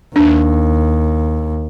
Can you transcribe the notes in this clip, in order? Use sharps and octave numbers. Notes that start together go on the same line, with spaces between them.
D#2 D4